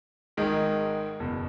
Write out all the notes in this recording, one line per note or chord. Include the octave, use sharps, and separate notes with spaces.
G#1 G#2 D#3 G#3
F#1 E2 B2